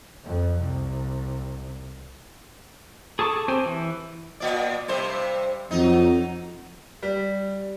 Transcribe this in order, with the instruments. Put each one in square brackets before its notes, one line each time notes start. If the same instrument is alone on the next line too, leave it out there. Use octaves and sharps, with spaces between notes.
[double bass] F2
C2
[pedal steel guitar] G#4 A4 A5 C#6 D6
C4 G4 C5 G#5
E3
[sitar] A#2 D5
G2 C3 C5
[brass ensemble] F2 [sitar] F#3 D#4
[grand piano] G3